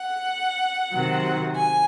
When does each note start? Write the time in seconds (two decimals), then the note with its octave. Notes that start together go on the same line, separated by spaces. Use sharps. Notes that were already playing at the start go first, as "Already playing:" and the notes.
Already playing: F#5
0.93 C3 D#3 F#3
1.56 G#5